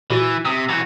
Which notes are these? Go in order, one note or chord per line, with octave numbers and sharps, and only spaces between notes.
A#2 E3 F#4 A6
C3 D#6
E3 F#4 F#6 G#6